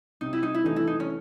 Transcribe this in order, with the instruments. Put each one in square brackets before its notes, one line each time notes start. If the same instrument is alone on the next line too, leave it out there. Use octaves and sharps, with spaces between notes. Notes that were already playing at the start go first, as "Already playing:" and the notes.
[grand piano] C3 [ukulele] D#4
[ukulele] E4
D#4
E4
[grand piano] E3 A3 D4 [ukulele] D#4
[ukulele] E4
D#4
C#4